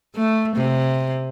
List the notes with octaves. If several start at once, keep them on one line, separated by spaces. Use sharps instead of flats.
A3
C3